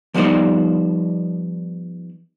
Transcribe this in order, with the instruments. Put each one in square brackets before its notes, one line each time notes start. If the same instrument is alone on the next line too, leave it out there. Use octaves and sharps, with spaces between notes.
[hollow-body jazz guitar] F3 G3 B3 D#4 C5 D5